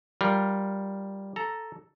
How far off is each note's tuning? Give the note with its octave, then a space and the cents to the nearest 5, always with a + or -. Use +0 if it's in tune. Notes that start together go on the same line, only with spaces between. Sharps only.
G3 +0 F4 +0 A#4 +0
A4 +0 A#5 +0